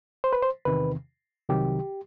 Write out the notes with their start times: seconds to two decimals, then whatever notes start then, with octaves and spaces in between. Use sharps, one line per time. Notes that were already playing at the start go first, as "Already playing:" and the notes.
0.24 C5
0.33 B4
0.43 C5
0.65 E2 C3 D#3 B4
1.49 C2 C3 D#3 F#3 G4